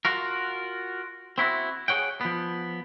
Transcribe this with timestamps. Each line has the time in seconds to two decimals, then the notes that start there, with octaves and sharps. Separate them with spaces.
0.05 F4 F#4 A#4
1.38 C4 E4 F#4
1.88 G#4 A4 C#5 F#5 G5
2.21 F3 B3